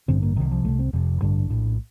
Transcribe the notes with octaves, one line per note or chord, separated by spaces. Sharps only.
A1 G2 D3 C4
A#3
C2 C3 D#3
F3
C2 C3 A3
C4
F1 F2 C3
A1 G2 D3 D4
A#1 A2